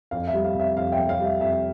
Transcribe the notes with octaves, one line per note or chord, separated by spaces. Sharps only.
F2 F5
E5
G3
F5
C3
E5
F2 F5
E5 G5
C3
F5
G3
E5
F2 E5